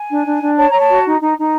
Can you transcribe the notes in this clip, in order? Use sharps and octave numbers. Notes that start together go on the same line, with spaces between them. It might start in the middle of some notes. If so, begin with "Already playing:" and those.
Already playing: G#5
D4
D4
D4
C#5 A5
C#5 A#5
A5
F#4
D#4
D#4
D#4